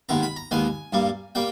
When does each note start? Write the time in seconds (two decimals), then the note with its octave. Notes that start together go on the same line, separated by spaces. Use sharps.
0.09 D#2 D#3 G#3 B3 A#5
0.23 B5
0.36 A#5
0.51 D#2 D#3 G#3 B3 G#5
0.93 G2 G3 A#3
1.35 G3 A#3 G5